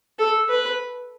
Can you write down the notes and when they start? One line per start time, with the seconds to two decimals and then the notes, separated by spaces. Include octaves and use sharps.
0.19 A4
0.49 B4